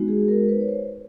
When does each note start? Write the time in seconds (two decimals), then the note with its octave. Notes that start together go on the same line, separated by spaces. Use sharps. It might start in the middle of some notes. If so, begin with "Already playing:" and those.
Already playing: G#3 B3 D#4 F#4
0.08 G#4
0.28 A#4
0.49 B4
0.60 C#5
0.68 C5